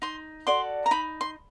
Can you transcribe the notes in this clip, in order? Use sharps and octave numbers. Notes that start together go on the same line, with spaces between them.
D#4 C6
F#4 A4 D5 C6
A#5
D#4 B5
C6